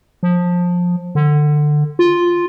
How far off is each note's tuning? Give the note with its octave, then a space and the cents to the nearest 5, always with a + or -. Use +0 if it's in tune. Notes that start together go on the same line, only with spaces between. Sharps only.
F3 +20
D3 +20
F4 +0